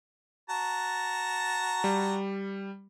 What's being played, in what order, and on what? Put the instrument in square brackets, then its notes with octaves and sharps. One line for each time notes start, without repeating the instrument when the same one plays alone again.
[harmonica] F#4 A5 A#5
[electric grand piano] G3